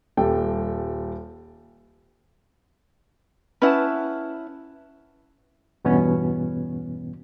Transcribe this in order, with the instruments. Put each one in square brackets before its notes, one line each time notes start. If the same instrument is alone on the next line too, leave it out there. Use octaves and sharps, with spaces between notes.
[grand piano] D#1 G3 A4 G5
[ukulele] C#4 E4 A5 [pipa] B4 F#5
[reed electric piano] E2 G2 B2 E3 B3 C#4